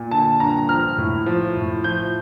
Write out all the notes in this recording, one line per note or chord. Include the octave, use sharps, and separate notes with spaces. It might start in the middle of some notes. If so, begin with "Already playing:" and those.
Already playing: A#2
D3 A5
G2 A#5
F3 F6
A2
F3
A2
F3 G6